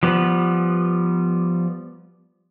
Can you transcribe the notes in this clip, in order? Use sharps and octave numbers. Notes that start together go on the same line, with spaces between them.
F3 G3 B3